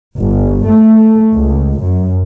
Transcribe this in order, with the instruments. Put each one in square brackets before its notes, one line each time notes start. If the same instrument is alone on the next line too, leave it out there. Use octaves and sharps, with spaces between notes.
[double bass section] G1
A3
C#2
F#2